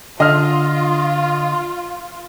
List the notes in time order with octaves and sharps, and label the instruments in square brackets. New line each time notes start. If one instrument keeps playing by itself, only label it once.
[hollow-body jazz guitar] D3 [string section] F4 [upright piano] D#5 F6